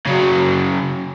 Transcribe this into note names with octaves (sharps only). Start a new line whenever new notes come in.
C#3 F#3